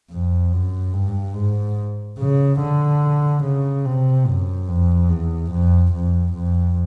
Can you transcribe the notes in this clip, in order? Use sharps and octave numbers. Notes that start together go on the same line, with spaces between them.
F2
F#2
G2
G#2
C#3
D3
C#3
C3
F#2
F2
E2
F2
F2
F2